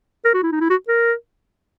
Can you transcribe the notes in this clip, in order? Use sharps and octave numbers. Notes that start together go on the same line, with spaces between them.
A#4
F#4
E4
D#4
E4
F#4
A#4